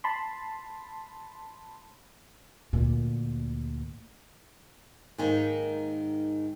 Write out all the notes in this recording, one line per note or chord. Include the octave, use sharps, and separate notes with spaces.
A5 B5 C6
D2 A#2
G#2 D#3 A#3